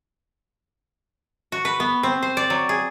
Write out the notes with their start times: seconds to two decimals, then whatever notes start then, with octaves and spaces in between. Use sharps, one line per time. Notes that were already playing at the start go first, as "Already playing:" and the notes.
1.52 F#4
1.65 B4
1.80 B3
2.03 C4
2.23 C5
2.37 D5
2.50 F#3
2.69 G#4